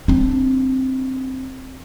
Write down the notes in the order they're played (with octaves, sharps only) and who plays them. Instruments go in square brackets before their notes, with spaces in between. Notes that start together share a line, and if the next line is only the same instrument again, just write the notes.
[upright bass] C4 D4